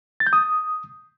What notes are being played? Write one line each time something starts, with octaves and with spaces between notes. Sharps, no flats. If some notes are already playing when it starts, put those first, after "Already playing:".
A6
G6
D#6